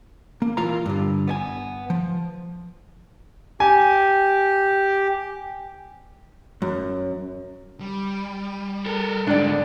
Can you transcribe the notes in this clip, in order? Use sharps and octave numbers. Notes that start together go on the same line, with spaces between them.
A#3
A#2 E3 F4 A#4 F5 A#5
G2 D3
B3 D5 G#5
F3
G4 G#5
F#2
G3
A4 A#4
G#2 D3 D4 D5